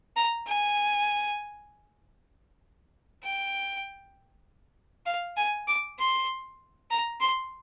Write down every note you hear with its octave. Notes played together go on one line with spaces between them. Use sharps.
A#5
G#5
G5
F5
G#5
D6
C6
A#5
C6